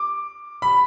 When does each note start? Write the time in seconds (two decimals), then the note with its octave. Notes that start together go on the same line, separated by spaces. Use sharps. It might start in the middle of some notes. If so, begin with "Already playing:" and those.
Already playing: D6
0.62 B5